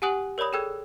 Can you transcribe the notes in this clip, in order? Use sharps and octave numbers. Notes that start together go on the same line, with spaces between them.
G4 F#5 G#5 D#6 F#6 F#7
A#4 C#5 D5 B5 D#6
G#4 A4 G5 E6 F#6 G#6